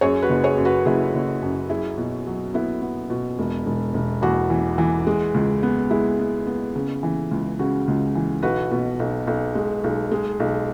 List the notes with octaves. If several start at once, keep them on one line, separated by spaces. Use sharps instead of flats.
F#2 G#4 C#5
F#4 B4
F#1
G#4 C#5
F#2
F#4 B4
F#1 E4 G#4
F#1
F#2
F#3 E4 G#4
B2
F#3
B3 E4
B3
B2
E1
E1
E1
E2 F#4
E3
E3
G#3
C#2
B3
G#3 E4
B3
B3
C#3
E3
C#2
C#3 F#4
C#2
E3
B1 F#4 B4
B2
B1
B1
G#3
B1
G#3
B1